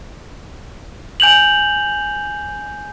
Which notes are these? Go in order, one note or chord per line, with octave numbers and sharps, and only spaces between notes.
G#5 G6 F7 F#7